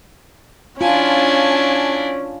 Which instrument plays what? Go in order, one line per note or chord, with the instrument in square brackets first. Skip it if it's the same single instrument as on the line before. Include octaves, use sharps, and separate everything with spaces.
[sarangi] C#4 [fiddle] D4 E4 [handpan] F4 [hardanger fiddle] G#5 A5